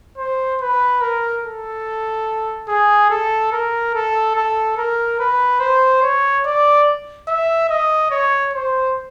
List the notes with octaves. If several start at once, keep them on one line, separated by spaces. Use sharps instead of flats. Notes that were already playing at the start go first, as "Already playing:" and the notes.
C5
B4
A#4
A4
G#4
A4
A#4
A4
A4
A#4
B4
C5
C#5
D5
E5
D#5
C#5
C5